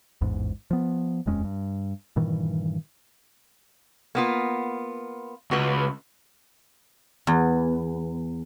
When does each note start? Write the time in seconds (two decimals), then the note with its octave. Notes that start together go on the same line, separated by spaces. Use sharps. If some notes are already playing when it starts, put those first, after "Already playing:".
0.21 A1 E2 G#2
0.71 F3 B3
1.26 D#1 F2 G#3 C#4
1.44 G2
2.16 G2 A#2 D#3 E3
4.15 A#3 B3 F4
5.51 C#2 F#4 B4
7.27 E2